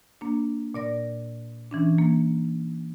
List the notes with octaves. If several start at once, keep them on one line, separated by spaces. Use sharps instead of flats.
A#3 D4
A#2 D5 A#6
E3 C#4 D4
A#3